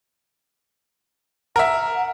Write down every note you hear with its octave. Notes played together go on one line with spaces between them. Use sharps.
A#4 E5 F#5